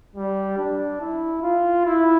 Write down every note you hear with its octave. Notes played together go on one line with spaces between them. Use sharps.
G3
D4
E4
F4
E4